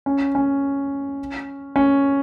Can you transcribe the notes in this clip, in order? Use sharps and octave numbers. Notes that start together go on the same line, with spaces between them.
C#4
C#4
C#4